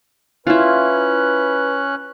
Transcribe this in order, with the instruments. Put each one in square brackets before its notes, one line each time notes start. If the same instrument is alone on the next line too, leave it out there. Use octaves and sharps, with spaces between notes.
[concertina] C#4 F#6 [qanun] E4 F4 [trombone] B4